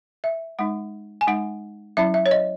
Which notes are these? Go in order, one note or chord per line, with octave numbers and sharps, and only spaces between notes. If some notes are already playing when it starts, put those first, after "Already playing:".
E5
G#3 D#4 F#5
G#5
G#3 D#4 F#5
F#3 C#4 E4 E5
E5
C#5
D#5